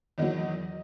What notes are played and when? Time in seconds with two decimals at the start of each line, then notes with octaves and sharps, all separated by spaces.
0.18 E2 D#3 F#3 D#5